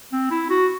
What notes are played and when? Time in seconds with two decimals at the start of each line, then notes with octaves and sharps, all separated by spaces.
0.12 C4
0.31 E4
0.50 F#4